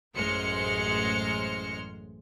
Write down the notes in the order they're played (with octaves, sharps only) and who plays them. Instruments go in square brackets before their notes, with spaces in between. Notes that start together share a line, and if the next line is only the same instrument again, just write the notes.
[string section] A1 F#2 G#3 C5 F6 C#7